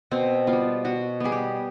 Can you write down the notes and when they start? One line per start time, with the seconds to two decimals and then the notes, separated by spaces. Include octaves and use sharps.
0.11 B2 C4
0.47 B3 F4
0.53 G3
0.84 B2 F#4
1.20 G3 B3 G#4
1.32 G4